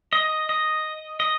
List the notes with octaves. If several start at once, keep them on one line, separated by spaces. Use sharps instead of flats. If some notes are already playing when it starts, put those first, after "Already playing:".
D#5
D#5
D#5